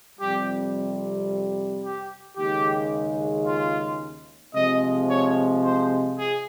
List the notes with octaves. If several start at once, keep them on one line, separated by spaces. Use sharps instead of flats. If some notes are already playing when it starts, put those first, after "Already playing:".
F2 C3 G3 G4
G4
D#2 C#3 G#3 G4
F4
C3 F3 G#3 D#5
C#5
C5
G#4